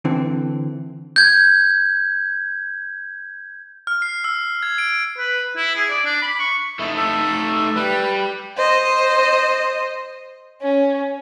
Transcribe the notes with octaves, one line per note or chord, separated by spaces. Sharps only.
D3 E3 C4
G6 G#6
F6
C7
E6
G#6
D7
B4
E4
G#4
D5
D4
B5
C#6
A3 D#4 E4
A4 E5
G3 B4
C5 D#5
C#4